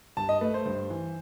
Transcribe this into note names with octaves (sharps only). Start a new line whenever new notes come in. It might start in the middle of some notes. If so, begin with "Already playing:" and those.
G2 A5
D#5
A3 B4
C5
G2
E3